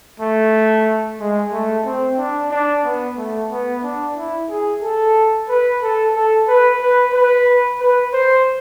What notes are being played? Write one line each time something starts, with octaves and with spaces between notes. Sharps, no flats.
A3
G#3
A3
C4
D4
D4
B3
A3
B3
D4
E4
G#4
A4
B4
A4
A4
B4
B4
B4
B4
C5